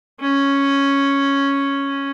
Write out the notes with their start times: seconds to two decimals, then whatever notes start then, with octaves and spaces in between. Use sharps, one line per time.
0.20 C#4